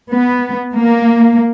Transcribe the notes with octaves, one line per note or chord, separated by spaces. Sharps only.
B3
A#3